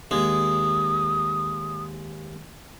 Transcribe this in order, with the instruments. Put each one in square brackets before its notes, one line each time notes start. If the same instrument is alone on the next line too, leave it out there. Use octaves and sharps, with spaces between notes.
[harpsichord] D#2 G#3 [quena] D#6